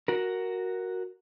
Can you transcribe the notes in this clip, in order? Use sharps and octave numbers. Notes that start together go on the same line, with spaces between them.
F#4 A#4